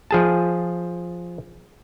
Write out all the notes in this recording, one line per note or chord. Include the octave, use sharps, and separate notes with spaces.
F3 G#4 A5